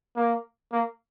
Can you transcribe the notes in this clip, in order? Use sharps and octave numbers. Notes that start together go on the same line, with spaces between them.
A#3
A#3